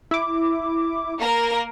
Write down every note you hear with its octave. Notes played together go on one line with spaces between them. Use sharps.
E4 D6
A#3 A#4